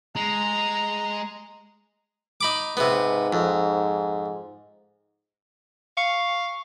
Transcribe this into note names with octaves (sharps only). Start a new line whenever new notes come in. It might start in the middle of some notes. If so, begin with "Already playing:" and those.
G#3 A#5
D#4 B5 D6
G#2 C3 B3
F2
F5 C#6